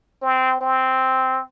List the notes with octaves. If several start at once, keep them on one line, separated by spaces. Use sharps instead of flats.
C4
C4